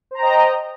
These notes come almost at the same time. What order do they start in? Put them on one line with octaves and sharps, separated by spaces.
C5 A#5 G5 D#5